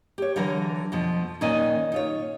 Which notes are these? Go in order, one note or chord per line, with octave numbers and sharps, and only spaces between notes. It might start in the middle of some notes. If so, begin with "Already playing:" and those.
G4 C#5
D3 E3 F#3 A#4
F2 B2 F3
A#2 D#3 C#4 D#4 D#5 G#5
D#4 F4 C#5